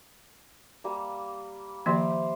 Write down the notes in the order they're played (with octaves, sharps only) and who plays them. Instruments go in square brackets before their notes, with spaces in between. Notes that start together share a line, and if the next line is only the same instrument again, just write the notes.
[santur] G3 A#3
[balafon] D#3 F3 A#3 [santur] G4 C5 E5